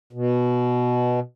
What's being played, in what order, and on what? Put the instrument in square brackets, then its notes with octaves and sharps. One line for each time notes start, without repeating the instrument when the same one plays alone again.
[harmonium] B2